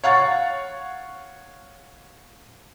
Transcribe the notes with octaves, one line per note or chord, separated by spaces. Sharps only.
C#5 F5 F#5 C#6 A6